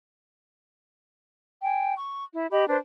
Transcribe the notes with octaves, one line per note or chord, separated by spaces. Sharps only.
G5 G#5
C#6
E4
G4 D#5 B5
D4 B4 C5